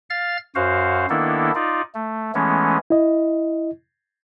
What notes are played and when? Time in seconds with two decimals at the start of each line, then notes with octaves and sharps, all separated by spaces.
0.10 F5 F6 A6
0.55 F#2 F#4 C5 F5
1.10 D#3 A#3 B3 D4 E4 A4
1.55 D#4 F4 D5
1.95 A3
2.35 E3 G#3 A3 B3 C#4
2.90 E4 D#5